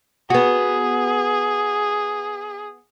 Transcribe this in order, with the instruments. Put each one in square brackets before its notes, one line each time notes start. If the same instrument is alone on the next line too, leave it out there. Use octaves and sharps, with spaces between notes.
[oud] B3 F#4 [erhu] G#4